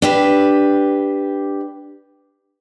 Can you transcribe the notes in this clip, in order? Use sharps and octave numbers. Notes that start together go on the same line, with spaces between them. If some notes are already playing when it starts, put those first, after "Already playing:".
D4 G4 B4